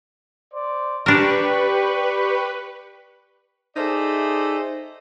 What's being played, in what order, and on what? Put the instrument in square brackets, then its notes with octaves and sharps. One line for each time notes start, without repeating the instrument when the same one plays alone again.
[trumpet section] C5 D5
[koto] D4 A#4 [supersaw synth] G4 B5 C#6 [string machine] B4 [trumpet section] D5
[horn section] D#4 G#4 A4 C5 D5 E5